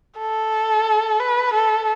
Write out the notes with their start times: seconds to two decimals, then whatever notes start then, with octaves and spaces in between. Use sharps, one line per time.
0.18 A4
1.20 B4
1.54 A4